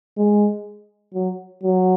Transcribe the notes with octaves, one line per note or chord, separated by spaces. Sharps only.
G#3
F#3
F#3